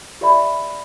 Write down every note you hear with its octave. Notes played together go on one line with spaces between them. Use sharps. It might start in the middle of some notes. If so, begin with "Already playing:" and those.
G4 C5 D5 E5 B5